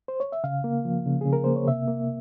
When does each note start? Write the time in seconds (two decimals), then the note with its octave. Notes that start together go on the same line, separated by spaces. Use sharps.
0.08 C5
0.20 C#5
0.32 E5
0.44 C#3 F5
0.64 A#3
0.85 F3
1.06 C#3
1.21 C#3 G#4
1.33 A#4
1.44 A#3 C5
1.56 C#5
1.67 C3 E5
1.87 A#3